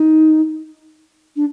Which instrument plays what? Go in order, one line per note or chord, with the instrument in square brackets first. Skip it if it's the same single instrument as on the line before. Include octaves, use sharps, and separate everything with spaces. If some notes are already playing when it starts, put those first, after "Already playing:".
Already playing: [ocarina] D#4
D4